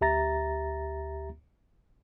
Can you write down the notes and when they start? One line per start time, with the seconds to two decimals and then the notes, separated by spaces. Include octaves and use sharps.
0.01 D2 G4 E5 A#5 A6 A#6